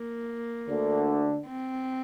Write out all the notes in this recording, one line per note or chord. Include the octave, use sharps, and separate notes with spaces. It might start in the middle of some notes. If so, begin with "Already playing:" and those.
Already playing: A#3
D2 D3
C4